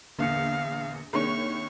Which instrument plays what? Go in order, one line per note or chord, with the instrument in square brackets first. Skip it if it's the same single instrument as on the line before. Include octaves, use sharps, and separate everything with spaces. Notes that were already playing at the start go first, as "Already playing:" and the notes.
[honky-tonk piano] A#1 E2 [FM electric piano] D3 A#3 C#7 [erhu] F5
[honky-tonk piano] C2 D#3 C#5 [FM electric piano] A#3 D4 G#4 [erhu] C#6